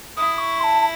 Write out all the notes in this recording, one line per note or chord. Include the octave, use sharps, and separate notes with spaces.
E4 D#6
C#6
C6
A5
A5